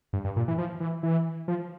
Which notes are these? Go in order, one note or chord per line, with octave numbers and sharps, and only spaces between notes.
G2
G2
A#2
E3
F3
E3
E3
F3